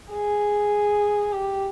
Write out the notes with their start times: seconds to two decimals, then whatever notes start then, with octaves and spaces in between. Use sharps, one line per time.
0.12 G#4
1.33 G4